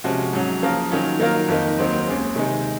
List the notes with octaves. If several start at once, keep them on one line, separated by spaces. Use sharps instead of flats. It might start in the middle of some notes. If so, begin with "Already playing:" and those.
C3 F3 G#3 C#4 F#4
G#2 F#3 C#4
C#3 F3 A#3 F4 A#4
D#3 F#3 C#4 F4
D#3 F#3 A#3 F4 A#4
F2 D#3 A#3 D#4
D#2 D#3 F#3 C4 D#4
D#2 C#3 G#3 C4
C3 D#3 G#3 D#4